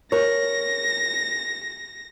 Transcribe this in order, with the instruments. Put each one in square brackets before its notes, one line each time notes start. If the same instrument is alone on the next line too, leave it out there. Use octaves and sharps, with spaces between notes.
[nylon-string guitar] A#4 C#5 [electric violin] A#6